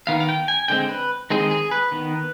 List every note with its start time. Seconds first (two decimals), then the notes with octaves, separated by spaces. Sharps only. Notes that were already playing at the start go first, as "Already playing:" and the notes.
0.07 D#3 B3 F5
0.20 F5
0.29 G5
0.48 G#5
0.68 D3 G#3 C4 G5
0.89 B4
1.30 D#3 G#3 C4 G#4
1.51 G#4
1.71 B4
1.92 D#3 B3